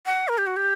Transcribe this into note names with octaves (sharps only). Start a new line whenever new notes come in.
F#5
A#4
G4
F#4
G4